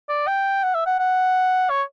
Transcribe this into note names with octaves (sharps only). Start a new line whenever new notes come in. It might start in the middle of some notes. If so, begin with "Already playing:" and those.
D5
G5
F#5
E5
F#5
F#5
C#5